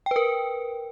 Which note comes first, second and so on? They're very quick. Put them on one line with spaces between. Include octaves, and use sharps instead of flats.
G5 B4 A#4